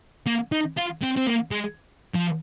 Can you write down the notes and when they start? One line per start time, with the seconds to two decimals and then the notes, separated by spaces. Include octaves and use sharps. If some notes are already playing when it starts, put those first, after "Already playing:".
0.26 A#3
0.52 D#4
0.77 F4
1.02 C4
1.16 C4
1.27 A#3
1.51 G#3
2.14 F3